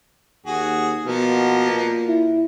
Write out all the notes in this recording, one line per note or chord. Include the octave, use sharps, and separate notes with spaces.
D#2 F#4 G#4
B2 F3 A#3 B3
A#2
E4